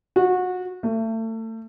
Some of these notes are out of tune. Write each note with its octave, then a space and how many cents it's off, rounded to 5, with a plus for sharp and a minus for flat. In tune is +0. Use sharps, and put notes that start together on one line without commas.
F#4 -25
A3 +30